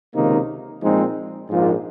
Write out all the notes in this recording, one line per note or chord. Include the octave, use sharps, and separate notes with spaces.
C#2 C3 D#3 A#3 D#4
A#2 F3 G#3 C4 D#4
A#1 G#2 F3 A#3 F4